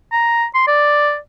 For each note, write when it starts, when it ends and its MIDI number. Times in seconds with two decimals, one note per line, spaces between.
0.12 0.46 82
0.55 0.64 84
0.68 1.17 74